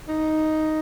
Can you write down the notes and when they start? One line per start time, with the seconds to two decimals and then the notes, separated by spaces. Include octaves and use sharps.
0.09 D#4